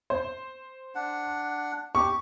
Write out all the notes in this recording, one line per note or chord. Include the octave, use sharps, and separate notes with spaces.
C5
D4 F#5
G4 C#6